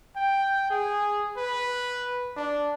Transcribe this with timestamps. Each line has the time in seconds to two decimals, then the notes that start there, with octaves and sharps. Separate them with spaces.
0.16 G5
0.70 G#4
1.37 B4
2.36 D4